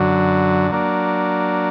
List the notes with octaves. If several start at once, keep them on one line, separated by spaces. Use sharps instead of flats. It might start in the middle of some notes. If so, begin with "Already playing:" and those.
Already playing: F#2 D3 F#3
F#3 A#3 D4